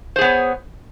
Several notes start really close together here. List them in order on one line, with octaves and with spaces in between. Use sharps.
C5 G#4 B3 C#5